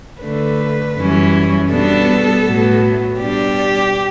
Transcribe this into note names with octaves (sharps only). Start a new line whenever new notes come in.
D3 A3 D4 B4
F#2 E3 G3 C#4 E4
B2 G3 B3 D4 A4
A2 F#3 B3
B2 G3 D4 G4